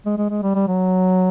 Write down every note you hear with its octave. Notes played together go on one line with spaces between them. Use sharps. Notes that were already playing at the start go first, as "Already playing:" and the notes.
G#3
G#3
G#3
G3
G3
F#3